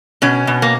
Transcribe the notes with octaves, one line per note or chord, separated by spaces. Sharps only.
B2 C#4
B2
A#3